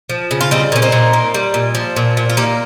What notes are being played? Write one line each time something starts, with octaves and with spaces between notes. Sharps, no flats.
F3
C#3
F4
G3 C4 D#4
A#2 C#4
C4 D#4
A#2
A#3
G3
A#2
F3
A#2
A#2
F4
A#3 D#4 G4